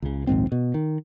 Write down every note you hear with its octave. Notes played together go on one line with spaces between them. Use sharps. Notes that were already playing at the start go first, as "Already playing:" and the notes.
C#2 C#3
A#1 D#2 G#2 C4
B2
D#3